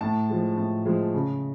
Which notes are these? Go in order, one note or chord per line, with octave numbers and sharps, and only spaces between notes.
A2 A5
F3 G#3
A2
F3 G#3
C#3